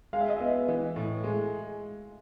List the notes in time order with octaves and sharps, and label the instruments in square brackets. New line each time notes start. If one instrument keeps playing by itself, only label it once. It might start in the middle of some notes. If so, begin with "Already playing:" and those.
[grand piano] G#3 [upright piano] F5
[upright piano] E5
D#5
[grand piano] B3 [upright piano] E5
[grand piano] E3
A2
G#3